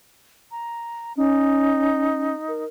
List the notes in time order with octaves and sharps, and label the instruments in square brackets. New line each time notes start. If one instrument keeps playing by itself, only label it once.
[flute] A#5
[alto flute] C#4 [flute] D#4
[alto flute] A#4